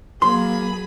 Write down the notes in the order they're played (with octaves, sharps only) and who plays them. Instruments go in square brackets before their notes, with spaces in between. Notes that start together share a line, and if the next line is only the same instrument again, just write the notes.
[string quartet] F#3 G#4 B5 [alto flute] A#3 [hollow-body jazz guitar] C6